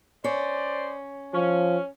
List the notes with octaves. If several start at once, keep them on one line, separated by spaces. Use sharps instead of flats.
C#4 C5 D5
F3 C#4